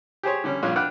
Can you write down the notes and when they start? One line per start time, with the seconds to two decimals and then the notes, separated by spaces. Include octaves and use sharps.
0.23 G4 G#4 C5 C#5
0.44 D3 G3 C#4
0.63 A#1 G2 F4 C#5
0.76 D4 B4 F#5 G5 F6